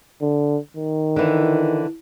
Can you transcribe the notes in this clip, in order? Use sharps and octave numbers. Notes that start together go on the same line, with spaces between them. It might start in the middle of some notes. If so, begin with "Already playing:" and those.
D3
D#3
D3 E3